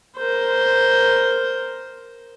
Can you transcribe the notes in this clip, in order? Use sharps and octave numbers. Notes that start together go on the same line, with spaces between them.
A#4 C5